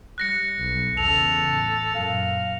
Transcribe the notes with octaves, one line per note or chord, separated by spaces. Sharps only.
G3 F#6 A#6 C#7
B1
E2 C#3 A4 F7
A2
F#2 A#2 F5